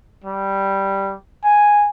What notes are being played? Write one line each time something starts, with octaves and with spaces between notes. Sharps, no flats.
G3
G#5